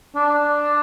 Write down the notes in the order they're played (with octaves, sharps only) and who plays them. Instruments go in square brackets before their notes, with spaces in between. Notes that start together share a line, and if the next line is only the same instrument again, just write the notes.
[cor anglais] D4